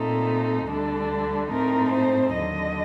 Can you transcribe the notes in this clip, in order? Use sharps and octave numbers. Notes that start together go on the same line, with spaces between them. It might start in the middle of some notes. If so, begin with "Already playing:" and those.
Already playing: A#2 A3 C4 D#4 A4
D2 D3 G3 D4 A4
A2 A3 C4 D#4 A#4
C5
D#2 D3 F#3 D#5